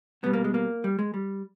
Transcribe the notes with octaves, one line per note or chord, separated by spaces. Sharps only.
B2 G3 B3
A#3
G#3
A#3
G3
G#3
G3